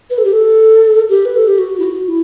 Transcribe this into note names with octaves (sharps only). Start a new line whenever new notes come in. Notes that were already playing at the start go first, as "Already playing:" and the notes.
B4
A4
G4
A4
G4
B4
A4
G4
F#4
E4
F#4
E4